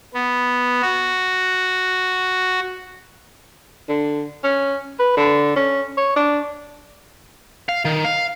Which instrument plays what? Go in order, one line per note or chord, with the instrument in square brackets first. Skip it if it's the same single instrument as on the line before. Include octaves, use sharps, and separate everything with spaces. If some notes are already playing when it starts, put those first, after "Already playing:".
[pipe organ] B3
F#4
[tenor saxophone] D3
C#4
B4
D3
C#4
C#5
D4
[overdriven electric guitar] F5
D#3
F5